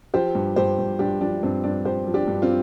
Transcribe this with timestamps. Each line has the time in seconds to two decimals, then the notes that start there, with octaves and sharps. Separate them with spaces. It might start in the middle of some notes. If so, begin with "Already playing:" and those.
0.14 F3 G4 C5
0.35 G2
0.56 G2 G4 C5
0.78 G2
0.99 G2 D4 G4
1.21 F3 D4
1.43 G2 C4
1.64 G2 D4
1.85 F3 G4 C5
2.06 F3
2.14 D4 G4
2.28 G2
2.42 C4 F4